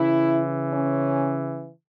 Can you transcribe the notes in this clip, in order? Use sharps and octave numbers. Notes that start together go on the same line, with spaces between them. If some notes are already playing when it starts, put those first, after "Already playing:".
Already playing: C#3 E3 E4
C#4